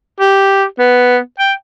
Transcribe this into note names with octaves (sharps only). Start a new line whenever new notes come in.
G4
B3
G5